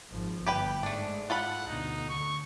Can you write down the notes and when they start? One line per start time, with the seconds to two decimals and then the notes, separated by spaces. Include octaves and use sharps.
0.11 G#1 F3
0.46 G1 G4 B4 G5
0.83 G#2 G#3 A3 D4
1.30 F4 A4 F#5 B5
1.67 D2 B2 D#4
2.09 D3 C#6